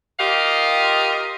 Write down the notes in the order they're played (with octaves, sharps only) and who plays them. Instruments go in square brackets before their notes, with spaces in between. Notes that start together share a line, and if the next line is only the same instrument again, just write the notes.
[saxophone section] F4 G4 A#4 D#5 F5